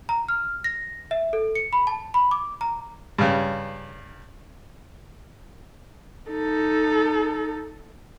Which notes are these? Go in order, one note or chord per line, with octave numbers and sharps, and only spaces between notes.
A#5
F6
A#6
E5
A4
C#7
B5
A5
B5
D6
A#5
G2 C#3
D#4 A4